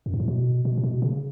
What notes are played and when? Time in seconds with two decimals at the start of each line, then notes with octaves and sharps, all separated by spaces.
0.06 F#2
0.14 G#2
0.20 A2
0.28 B2
0.65 B2
0.78 A2
0.84 B2
1.02 C#3